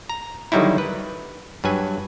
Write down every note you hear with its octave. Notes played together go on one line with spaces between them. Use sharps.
A#5
D3 D#3 F#3 G3 D#4 E4
B4
G2 F#3 B4 G#5